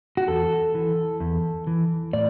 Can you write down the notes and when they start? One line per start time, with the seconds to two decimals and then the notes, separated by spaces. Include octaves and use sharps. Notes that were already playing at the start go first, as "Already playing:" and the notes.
0.17 F#4
0.28 E2 A4
0.75 E3
1.20 E2
1.67 E3
2.13 A2 D5